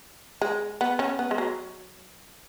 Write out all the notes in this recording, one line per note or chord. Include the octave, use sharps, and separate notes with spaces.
G#3
B3
C#4
B3
G#3
F#3